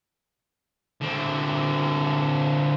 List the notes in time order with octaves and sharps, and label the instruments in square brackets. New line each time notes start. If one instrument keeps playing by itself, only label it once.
[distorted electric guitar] D3 C4